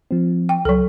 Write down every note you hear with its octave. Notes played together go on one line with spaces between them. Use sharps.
F3 C4
G5
C#2 F#3 A4